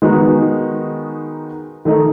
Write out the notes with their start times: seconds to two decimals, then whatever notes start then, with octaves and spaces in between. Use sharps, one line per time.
0.02 D#3 G#3 B3 D#4 F#4
1.85 D#3 A3 D#4